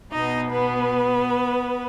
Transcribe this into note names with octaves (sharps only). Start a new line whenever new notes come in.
B2 B3 D#4 D#5
B3 B4